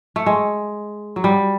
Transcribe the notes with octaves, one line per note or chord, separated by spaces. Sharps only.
A3
G#3
F#3
G3